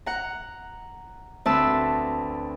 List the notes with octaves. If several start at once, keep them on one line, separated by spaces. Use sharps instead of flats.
F#5 A#5
D2 C4 B4 A5 E6